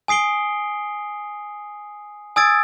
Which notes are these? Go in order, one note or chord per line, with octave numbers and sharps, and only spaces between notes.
G#5 D#6 C7 D7 G7
G#5 D#6 E6 G#6 A6 D7